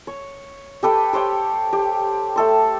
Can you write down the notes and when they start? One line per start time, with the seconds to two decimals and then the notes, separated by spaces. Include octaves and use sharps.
0.07 C#5
0.83 G4 A4 B4 G5
1.13 G4 C5 C#5 G5
1.73 G4
2.36 A3 A4 C6